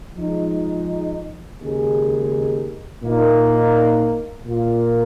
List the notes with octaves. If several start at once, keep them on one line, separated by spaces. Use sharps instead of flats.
F3 G#3 D#4
D#2 C#3 G#3 D#4 G#4
A#2 A#3 D#4
A#2 A#3 F4